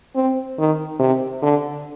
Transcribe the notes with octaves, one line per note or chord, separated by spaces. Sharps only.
C4
D#3
C3
D3